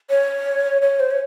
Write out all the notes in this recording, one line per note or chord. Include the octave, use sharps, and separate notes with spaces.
C#5
C#5
C5
C#5